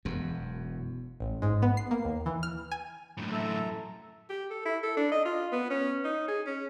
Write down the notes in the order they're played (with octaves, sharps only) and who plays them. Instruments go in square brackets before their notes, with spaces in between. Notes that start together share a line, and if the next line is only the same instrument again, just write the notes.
[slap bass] E1 F#2
[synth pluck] A1
G#2
B3
C7
A#3
D#2
E3
F6
G#5
[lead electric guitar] F#2 A2
[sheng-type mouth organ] A4 E5 A#5
[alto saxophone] G4
A4
E4
A4
D4
D#5
F4
B3
C#4
D#4
G#4
C#4